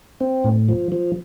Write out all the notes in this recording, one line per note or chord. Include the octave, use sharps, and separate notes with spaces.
C4
A2
F3
F3